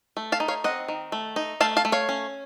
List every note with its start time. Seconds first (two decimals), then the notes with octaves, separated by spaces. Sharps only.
0.17 A3
0.32 F5 A5
0.40 D#4
0.48 C#5 F5
0.64 C4 D#5 F#5
0.88 D#3
1.12 A3
1.36 D#4
1.61 A3 F5 A5
1.77 F5 A5
1.85 A3
1.92 C#5 F5
2.09 C#4